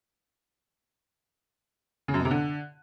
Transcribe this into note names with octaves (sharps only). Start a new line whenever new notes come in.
C#3
F#2
B2
C3
D3